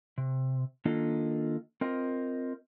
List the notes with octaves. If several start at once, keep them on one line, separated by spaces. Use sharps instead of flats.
C3
D#3 A#3 D4 F4 A4 D#5
C4 F4 A#4 D#5